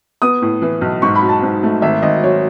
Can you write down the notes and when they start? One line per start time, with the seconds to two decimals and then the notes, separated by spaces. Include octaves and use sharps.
0.22 B3 D#6
0.42 A2
0.62 E3
0.81 B1
1.02 G#2 C#6
1.15 B5
1.22 F#3
1.29 A5
1.43 G#2
1.63 A3
1.82 G#1 E5
2.02 G#1 D#5
2.23 F#3 C#5